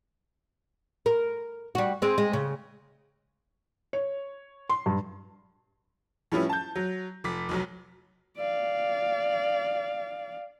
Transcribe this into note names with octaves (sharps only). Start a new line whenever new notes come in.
A#4
G3 F#4
G#3 C4
G#3
C#3
C#5
C6
G2
A2 F3 G3 C#4 E4 B4
A5 G6
F#3
F1 D6 B6
F1 B1 F#3
D5 F5